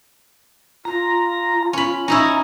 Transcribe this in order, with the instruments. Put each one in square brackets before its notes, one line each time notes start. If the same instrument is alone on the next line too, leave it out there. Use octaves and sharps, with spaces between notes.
[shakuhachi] F4 [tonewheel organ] A#5
[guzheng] C#4 B5
[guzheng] C#4 D#4 E4 [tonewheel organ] A#5